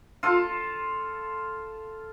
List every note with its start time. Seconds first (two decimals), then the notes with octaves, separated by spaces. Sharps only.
0.23 F4 A4